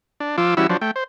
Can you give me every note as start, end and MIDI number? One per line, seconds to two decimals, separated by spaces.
0.20 0.36 62
0.38 0.54 53
0.38 0.54 65
0.38 0.54 86
0.38 0.54 88
0.57 0.67 52
0.57 0.67 55
0.57 0.67 61
0.57 0.67 64
0.57 0.67 66
0.57 0.67 88
0.70 0.77 53
0.70 0.77 54
0.70 0.77 62
0.70 0.77 72
0.81 0.91 57
0.81 0.91 79
0.96 1.04 72